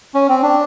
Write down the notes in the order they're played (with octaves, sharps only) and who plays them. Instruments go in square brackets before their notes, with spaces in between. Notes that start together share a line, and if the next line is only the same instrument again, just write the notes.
[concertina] C#4
C4
D4